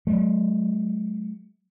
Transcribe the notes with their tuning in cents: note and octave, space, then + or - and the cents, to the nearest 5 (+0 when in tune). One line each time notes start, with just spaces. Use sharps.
F#3 +5 A3 -45